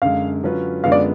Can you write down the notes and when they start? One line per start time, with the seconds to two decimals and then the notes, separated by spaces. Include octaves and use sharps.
0.02 F#2 D3 G#3 F5
0.43 D3 F#3 C#4 F4 B4
0.84 F#2 D3 G#3 B3 F4 F5
0.92 D5